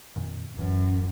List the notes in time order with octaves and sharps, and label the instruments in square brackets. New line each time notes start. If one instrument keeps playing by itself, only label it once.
[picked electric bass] F2 A#2 D#3
[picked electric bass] D1 E3 C#4 [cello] F#2